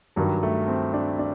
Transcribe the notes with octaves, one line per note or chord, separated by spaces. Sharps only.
G2 D#3 F#3
A3
C4
D4
D4